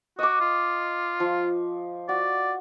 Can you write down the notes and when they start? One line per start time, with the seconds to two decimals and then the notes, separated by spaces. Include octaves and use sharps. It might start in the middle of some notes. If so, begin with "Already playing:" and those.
0.19 F#4 D#5 D6
0.40 F4
1.20 F3
2.09 F#4 D5